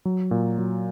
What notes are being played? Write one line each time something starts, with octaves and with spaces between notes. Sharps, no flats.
F#3
A#2
F#3